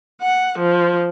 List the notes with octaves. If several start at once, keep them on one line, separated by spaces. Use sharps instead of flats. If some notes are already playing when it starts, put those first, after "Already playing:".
F#5
F3